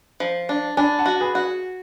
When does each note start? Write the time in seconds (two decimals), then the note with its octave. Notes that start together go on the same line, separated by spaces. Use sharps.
0.20 F3
0.49 D4
0.77 D4 G#5 B5
0.99 F#5 A5
1.06 F#4
1.20 G#4 B4
1.35 F#4